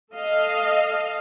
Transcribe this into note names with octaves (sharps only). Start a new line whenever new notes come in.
A4 D#5 F5